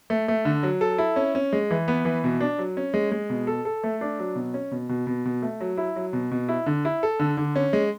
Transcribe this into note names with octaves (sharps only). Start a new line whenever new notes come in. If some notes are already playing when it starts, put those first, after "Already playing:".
A3
A3
D3
F#3
A4
E4
C#4
C#4
G#3
E3
B3
E3
B2
D4
F#3
C#4
G#3
G#3
B2
A4
A4
A3
D4
F#3
B2
C#4
B2
B2
B2
B2
A3
F#3
E4
F#3
B2
B2
E4
D3
E4
A4
D3
D3
C#4
G#3